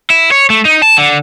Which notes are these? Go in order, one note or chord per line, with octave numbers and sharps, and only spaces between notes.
E4
C#5
A3
D#4
A5
D3